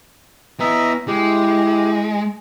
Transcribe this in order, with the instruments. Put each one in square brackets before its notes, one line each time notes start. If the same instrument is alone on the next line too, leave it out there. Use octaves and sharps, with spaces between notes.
[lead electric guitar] B3 E4 [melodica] D#5 E5 A#5
[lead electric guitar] G#3 [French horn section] E4 [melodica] G4